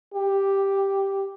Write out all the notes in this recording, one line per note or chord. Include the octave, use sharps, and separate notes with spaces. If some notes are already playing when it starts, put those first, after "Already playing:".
G4